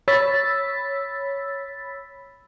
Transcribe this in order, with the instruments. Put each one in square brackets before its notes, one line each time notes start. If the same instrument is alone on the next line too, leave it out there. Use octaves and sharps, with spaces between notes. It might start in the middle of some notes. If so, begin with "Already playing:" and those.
[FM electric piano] C#5 B5 E6 A6 B6